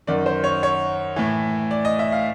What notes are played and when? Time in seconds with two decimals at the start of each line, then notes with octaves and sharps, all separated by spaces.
0.07 F#2 D#3 D5
0.26 C5
0.44 C#5
0.63 C#5
1.16 A2 E3
1.71 D5
1.85 D#5
1.99 E5
2.12 F5